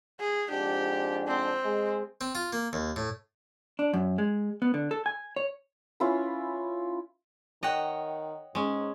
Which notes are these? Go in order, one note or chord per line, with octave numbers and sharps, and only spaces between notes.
G#4
F2 G#2 D4 G4
C4
G#3
C4
F4
A#3
D#2
A2
D4
F#2
G#3
B3
D3
A4
G#5
C#5
C#4 E4 F4 B4
D#3 C#5 D#5 F#5 G5
G#2 G#3 C#4